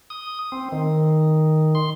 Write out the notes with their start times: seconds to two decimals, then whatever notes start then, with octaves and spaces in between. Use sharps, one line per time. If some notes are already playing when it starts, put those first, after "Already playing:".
0.10 D#6
0.52 C4
0.72 D#3
1.75 C6